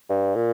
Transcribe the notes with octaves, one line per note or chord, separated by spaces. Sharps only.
G2
A#2